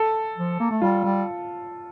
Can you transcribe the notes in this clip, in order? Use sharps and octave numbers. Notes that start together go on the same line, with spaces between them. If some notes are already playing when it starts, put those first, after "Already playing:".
Already playing: A4
F3
A#3
A3
G3 F4
G3